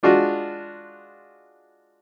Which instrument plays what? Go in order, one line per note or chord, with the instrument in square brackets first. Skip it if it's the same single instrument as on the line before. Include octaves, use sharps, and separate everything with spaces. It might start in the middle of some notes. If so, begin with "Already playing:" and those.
[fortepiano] G#3 D4 F4 F#4